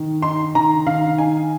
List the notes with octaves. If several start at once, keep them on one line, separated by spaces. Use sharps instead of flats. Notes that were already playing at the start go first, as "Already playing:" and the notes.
Already playing: D#3
D#4 C6
D#3 A#5
D#3 F5
D#4 G#5